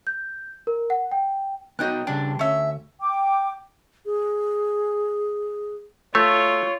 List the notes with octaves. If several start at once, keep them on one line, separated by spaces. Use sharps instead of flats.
G6
A#4
F#5
G5
B3 D#4 F#4 D#5 G5 F#6
C#3 G3 D4 G5
D2 C#4 E5
G5 D6
G#4
A3 F4 C#5